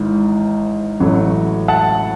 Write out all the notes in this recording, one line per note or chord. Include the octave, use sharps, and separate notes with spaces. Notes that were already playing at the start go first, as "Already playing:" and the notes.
Already playing: G#1 G#2 E3
A1 A2 F#3 A3
F#5 A5